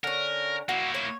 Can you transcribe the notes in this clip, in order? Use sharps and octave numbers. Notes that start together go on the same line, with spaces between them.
D3 C#4 A#4
A#3 E4 F#4
C#5